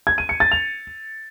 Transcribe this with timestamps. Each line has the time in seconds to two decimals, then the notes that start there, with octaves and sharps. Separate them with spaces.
0.07 G#6
0.18 D#7
0.29 C#7
0.40 A6
0.52 F7